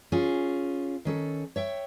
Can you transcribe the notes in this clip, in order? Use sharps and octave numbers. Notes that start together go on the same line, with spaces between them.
C#4 F4 G#4
D#3 C#4 A4
C#5 E5 G5